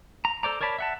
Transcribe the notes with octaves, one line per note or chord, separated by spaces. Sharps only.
A#5
A4 C5 D5 A#5
A#4 C#5 D5 A5 B5
E5 F#5 A5